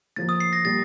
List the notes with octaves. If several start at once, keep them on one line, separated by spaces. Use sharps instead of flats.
A2 F3 A#3 A6
D#6
C7
A#6
A#2 G3 A#3 A6